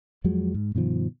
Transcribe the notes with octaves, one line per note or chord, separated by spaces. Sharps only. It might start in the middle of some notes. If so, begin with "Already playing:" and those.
F2 F3 F#3 G#3
G#2
G2 B2 D#3 F3